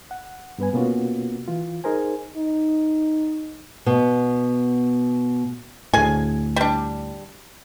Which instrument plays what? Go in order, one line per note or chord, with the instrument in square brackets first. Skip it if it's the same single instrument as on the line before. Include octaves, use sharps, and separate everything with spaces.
[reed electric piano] F#5
G2 B3 B4 G#5
B2 A#3 B3 C#4 F4 F#4
E3 F4
D#4 G#4 A#4 C5 G#5
[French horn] D#4
[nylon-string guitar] B2 B3
[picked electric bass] D2 A2 [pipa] G#4 G#5
[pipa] G3 D4